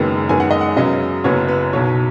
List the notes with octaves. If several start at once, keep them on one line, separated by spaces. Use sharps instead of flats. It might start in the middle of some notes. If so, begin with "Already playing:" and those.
Already playing: F#1 F#2 D#3 G#3 B3
F#2 D#3 G#3 B3 G#5
F#5
D#5
F#5
F#2 C#3 F#3 B3 D#5
F#1 F#2 F#3 B3 C#5
B4
B1 B2 F#3 C#5